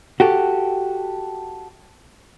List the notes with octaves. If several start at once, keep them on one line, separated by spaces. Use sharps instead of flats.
F#4 G4 A4